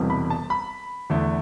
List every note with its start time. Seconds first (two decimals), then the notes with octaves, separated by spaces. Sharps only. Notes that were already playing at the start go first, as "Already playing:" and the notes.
Already playing: E1 E2 C3 E3 G3
0.10 B5
0.30 A5
0.50 B5
1.10 E2 D3 A3